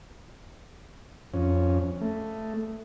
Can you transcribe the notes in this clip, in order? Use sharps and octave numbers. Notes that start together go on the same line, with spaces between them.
F2 C#4
A3